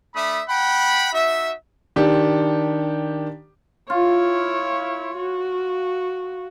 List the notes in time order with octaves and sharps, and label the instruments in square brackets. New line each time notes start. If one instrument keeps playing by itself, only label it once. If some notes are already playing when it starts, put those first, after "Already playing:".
[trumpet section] A3 D4 E5 B5 D#6
F#5 G5 B5
D#4 F#4 E5
[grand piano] D#3 D4 G4
[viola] E4 C#5 [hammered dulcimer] F4
[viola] F#4